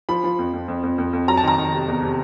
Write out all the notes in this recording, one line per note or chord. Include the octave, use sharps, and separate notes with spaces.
F3 B5
F3
F2
F2
F2
F2
F2
F2
F#3 A#5
A5
D#3 A#5
D#3
C3
E2
C3